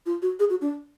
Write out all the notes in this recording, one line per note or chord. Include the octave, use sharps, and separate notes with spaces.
F4
F#4
G#4
F#4
D4